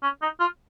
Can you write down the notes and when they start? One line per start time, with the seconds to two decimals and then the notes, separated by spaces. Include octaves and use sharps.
0.03 C#4
0.22 D#4
0.40 F4